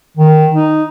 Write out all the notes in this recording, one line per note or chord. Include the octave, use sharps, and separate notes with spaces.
D#3
D#4